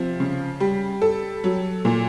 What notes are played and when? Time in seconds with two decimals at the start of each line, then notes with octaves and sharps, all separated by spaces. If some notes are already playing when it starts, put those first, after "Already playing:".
Already playing: C3 F3
0.20 C#3
0.60 G3
1.02 A4
1.44 F#3
1.85 A#2